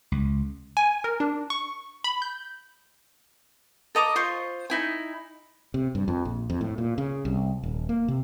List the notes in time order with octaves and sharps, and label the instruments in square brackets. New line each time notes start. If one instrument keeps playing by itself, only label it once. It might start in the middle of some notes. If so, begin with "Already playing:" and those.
[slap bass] C#2
[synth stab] G#5
A#4
D4
C#6
B5
G6
[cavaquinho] A4 D#5 A#5 D6
F4 C5 C6 C#6
D#4 E4 G#5
[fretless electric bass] C3
G2
F2
A#1
F2
A2
A#2
C#3
C2
D#1
A#3
C3